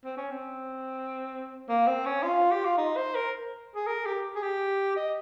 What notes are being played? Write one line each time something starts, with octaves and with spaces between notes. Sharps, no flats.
C4
C#4
C4
A#3
C4
C#4
F4
G4
F4
D#4
C5
A#4
G#4
A#4
G4
G#4
G4
D#5